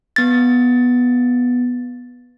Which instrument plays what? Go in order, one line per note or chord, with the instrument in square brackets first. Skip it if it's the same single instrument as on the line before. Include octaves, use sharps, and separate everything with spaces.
[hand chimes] B3 A6